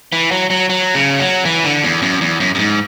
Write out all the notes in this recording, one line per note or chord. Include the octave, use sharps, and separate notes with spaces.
E3
F#3
F#3
F#3
C#3
F#3
E3
D3
E2
F#2
E2
F#2
F#2
G#2